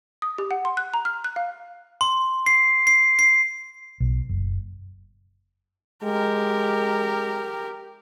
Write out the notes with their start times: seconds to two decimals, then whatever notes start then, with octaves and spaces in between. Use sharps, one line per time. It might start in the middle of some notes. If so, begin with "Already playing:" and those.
0.22 D#6
0.38 G4
0.51 F#5
0.65 C6
0.77 F#6
0.94 A#5
1.05 F6
1.24 F#6
1.36 F5
2.01 C6
2.46 C7
2.87 C7
3.19 C7
4.00 B1
4.29 F#1
6.04 G#3 G4 A#4